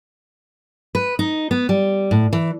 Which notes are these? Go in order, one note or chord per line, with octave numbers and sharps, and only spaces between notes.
B4
D#4
B3
G3
A2
E3